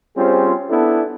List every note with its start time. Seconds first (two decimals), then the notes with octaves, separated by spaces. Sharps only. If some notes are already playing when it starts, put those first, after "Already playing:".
0.17 G3 C4 C#4 F4 G#4 C5
0.70 B3 D4 E4 A4